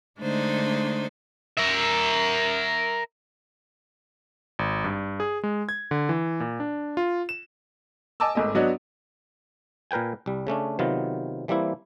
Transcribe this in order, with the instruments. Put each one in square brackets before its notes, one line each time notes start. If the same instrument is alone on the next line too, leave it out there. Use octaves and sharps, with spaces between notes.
[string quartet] D3 G#3 A3 D4 D#4 C5
[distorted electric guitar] A#4 E5
[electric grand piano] G#1
G2
G#4
G#3
G#6
D3
E3
A#2
D4
F4
E7
[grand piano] D#5 G#5 A5 D6 E6
G#1 G#2 A3 D#5
F#3 B3 D4 F#4 C#5 D#5
[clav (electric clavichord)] A#2 A#4 B4 G5 G#5
C2 G3
C#3 A3 C#4 D4
C3 D#3 F#3 B3 F4
E3 G3 A#3 C4 E4